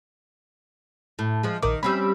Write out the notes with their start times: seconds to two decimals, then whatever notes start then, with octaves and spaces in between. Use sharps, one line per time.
1.19 A2
1.43 F3 G#3
1.63 A#1 D#3 A#4 D6
1.83 G3 C4 C#4 B5 E6